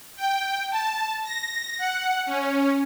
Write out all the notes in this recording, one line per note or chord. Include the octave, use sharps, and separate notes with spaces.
G5
A5
A#6
F#5
C#4